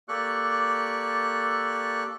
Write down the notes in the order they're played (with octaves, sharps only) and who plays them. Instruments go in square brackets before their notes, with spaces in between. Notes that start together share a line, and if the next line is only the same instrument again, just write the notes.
[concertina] A#3 G4 A4 D5 C#6 F#6